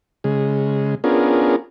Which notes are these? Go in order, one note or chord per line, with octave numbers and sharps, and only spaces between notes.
C#3 G#3
B3 C#4 D4 F4 G#4 A#4